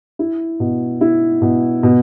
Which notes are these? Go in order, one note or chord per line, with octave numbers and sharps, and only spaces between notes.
E4
B2
E4
B2
B2